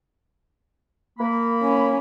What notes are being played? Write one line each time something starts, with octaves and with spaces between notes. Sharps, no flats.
A#3 B5
C#4